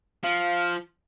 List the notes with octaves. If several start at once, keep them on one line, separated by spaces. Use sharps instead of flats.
F3 F5